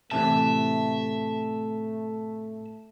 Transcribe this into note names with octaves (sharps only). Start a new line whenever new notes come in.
A2 C3 E3 A3 E5 A5